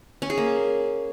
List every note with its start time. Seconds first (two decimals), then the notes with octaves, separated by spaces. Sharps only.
0.22 C#4
0.30 G#4
0.38 A#3